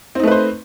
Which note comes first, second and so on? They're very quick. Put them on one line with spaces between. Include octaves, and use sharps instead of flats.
C4 D#4 A3 B4 C5